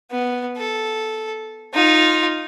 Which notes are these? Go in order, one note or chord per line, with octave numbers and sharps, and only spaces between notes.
B3
A4
D#4 F4